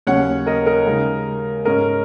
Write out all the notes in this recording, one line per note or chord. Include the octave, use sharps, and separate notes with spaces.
D#2 C#3 F#3 C#4 C#5 F#5
A#4 D#5
A#4 D#5
C#3 G#3 D#4
G#2 G#3 C#4 A#4 D#5